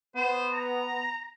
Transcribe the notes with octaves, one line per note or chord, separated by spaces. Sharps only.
B3 C5
A#5